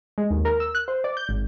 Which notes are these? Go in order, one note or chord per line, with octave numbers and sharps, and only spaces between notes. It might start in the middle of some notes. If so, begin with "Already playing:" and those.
G#3
D#2
A#4
E6
F#6
C5
D5
G6
G#1